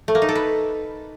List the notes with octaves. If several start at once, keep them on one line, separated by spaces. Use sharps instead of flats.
A3
A#3
D#4
A4
B4